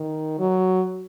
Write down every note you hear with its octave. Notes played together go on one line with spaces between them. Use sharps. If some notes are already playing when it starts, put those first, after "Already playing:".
Already playing: D#3
F#3